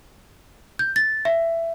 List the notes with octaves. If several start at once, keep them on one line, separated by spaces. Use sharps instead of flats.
G6
A6
E5